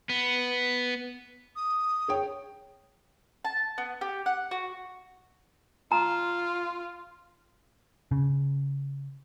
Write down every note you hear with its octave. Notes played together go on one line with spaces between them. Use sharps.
B3
D#6
G#4 C#5 G5
A5
B3
G4
F#5
F#4
F4 A#5
C#3